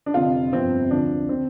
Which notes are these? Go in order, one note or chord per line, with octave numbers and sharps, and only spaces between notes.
D4
F1 F2 D3 F4
G1 F2 F3 C4
D2 D3 F3 D4
D3 C4